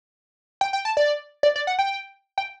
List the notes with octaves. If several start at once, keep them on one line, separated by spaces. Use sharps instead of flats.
G5
G5
A5
D5
D5
D5
F#5
G5
G5